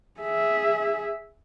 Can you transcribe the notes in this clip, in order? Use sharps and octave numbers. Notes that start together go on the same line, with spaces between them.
G#4 E5